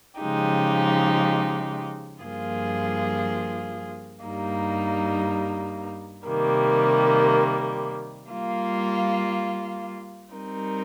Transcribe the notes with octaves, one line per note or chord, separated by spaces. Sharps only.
C#3 F3 G#3 D#4 G4
G2 F3 A#3 F4 G#4
G2 G3 A#3 D#4
C3 D#3 G3 A#3
G3 A#3 F4
G3 C4 D#4 A#4